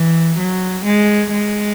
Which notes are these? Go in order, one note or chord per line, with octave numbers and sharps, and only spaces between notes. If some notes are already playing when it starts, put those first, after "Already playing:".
Already playing: E3
F#3
G#3
G#3